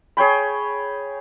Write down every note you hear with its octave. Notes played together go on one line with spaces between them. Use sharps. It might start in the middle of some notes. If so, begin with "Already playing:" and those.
G#4 C#5 G5 B5